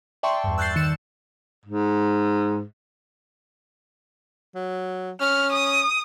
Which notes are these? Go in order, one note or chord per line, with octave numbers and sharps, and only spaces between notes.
D5 E5 G5 A5 C6 C#6
E2 G2
E6 F#6 G6 A6 C7
D#3 C#7 E7
G#2
F#3
C#4 F6
D#6